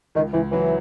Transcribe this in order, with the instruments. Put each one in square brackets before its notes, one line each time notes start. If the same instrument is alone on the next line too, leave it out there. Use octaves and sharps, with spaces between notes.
[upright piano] C#2 [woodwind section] D#3
[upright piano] C#2 [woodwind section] E3
[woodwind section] E3 [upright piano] F#3